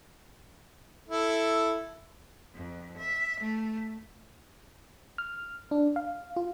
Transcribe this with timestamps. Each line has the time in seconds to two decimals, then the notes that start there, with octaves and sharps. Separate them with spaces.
1.09 E4 A4
2.55 F2
2.98 E5
3.41 A3
5.18 F6
5.71 D4
5.96 F5
6.36 F4